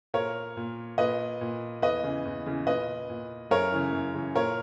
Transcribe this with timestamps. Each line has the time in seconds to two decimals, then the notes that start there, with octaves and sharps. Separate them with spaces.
0.14 A#2 A#4 C#5
0.57 A#2
0.98 A#2 B4 D#5
1.41 A#2
1.82 E2 B4 D#5
2.03 C#3 E3
2.25 E2
2.46 C#3 E3
2.66 A#2 B4 D#5
3.10 A#2
3.51 F#2 A#4 C#5
3.72 C#3 E3
3.93 F#2
4.15 C#3 E3
4.35 A#2 A#4 C#5